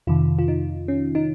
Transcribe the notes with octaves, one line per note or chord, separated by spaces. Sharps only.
F2 C3 D#3 F4
F4
D#4
C#4
D#4